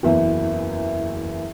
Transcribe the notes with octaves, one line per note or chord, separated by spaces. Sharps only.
F#1 E2 E3 E5